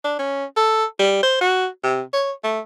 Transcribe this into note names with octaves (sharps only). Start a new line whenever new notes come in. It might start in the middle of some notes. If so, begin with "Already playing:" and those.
D4
C#4
A4
G3
C5
F#4
C3
C#5
A3